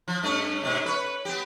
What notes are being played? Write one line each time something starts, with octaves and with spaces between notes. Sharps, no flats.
F3
G2 A3 C#4
G#2 B2 A3
B4 C#5
B3 G4